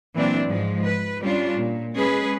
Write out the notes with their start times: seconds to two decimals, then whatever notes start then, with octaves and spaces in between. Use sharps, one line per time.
0.14 A#2 E3 F#3 C4 D4
0.46 G#2 F3 G#3
0.82 B4
1.21 G3 C#4 D4 F4
1.55 A#2
1.96 G#3 C#4 G#4 B4